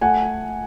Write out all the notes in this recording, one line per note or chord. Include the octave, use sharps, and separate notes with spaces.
A3 F#5 G#5